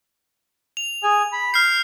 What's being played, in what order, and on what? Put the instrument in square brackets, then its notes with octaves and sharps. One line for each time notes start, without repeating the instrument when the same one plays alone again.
[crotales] F7
[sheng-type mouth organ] G#4 G#5
B5
[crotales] F6 C7 [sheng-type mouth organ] G6